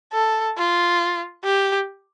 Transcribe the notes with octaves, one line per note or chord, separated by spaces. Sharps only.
A4
F4
G4